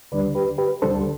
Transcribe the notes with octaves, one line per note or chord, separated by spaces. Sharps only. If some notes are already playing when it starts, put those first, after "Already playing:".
D2 D3 G3 D4 B4 D5
G4 B4
G4 B4
D2 D3 G3 D4 A4 C5